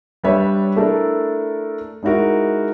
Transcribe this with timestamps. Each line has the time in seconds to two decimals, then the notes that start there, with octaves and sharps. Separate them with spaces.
0.24 G3 D4 B4 C#5 E5
0.76 A3 D4 E4 A4 A#4
2.03 G#3 D#4 E4 F#4 A#4